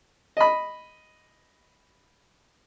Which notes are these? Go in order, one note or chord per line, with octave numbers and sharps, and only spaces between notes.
D#5 B5